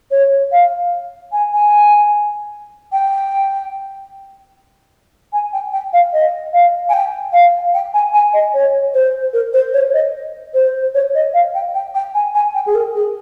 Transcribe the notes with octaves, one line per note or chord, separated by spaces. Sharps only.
C#5
F5
G#5
G#5
G5
G#5
G5
G5
F5
D#5
F5
G#5
G5
F5
G5
G#5
G#5
D#5
C#5
C5
A#4
C5
C#5
D#5
C5
C#5
D#5
F5
G5
G5
G5
G#5
G#5
G5
G#4
A#4
G#4